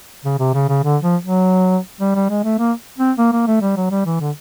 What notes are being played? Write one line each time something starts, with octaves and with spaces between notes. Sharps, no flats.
C#3
C3
C#3
C#3
D3
F3
F#3
G3
G3
G#3
A3
A#3
C4
A#3
A#3
A3
G3
F#3
G3
E3
D3